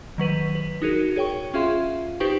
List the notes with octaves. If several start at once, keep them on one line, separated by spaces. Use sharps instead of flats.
D#3 F#3 B4 D#7
B4
D#4 F#4 G#4 A#4
G#4 C#5 G5 C#6
C#4 F4 G#4 E5 F5 C6
D#4 G4 B4 C5 G5 C#6